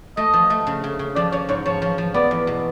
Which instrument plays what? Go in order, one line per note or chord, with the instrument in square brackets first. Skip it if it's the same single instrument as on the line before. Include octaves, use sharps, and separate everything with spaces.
[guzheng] A3 [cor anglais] D#5
[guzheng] F3
A3
C#3
C#3
C#3
[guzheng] F3 [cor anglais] D5
[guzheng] F3 [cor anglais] C#5
[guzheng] G#2 [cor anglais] C#5
[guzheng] F3 [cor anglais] C#5
[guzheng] F3
F3
[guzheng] B3 [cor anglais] D5
[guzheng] E2
B2